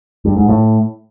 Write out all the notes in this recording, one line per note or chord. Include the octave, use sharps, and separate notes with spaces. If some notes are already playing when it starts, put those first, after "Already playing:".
G2
G#2
A2